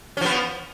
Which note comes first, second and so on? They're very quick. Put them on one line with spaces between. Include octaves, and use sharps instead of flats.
C#4 F3 B3